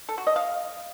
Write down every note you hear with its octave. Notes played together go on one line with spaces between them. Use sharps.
A4
F#4
D#5
F5